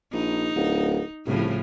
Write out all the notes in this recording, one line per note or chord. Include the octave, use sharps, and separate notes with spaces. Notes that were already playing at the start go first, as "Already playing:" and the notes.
A#1 D#4
D1
C2 A2 C#3 F3